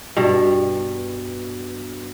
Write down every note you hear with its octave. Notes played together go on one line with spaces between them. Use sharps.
G2 B2